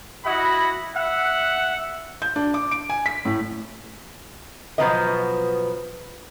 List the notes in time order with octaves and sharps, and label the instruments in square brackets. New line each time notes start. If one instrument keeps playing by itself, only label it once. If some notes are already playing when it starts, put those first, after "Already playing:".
[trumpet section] E4 F#4 D#5 F#5 B5
E5 F#5
[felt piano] G6
D4
D6
D7
G#5
B6
A2
[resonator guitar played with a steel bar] B2 F3 F#3 B3 B4 D#5